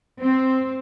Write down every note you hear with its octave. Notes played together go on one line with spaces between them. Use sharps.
C4